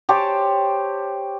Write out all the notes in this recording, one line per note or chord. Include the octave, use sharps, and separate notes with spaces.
G4 C5 C#5 A5